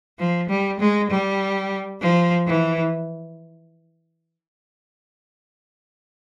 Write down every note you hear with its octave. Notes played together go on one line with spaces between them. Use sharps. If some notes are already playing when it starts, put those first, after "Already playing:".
F3
G3
G#3
G3
F3
E3